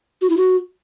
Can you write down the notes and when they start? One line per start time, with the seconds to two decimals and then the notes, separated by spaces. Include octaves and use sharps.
0.21 F#4
0.29 E4
0.37 F#4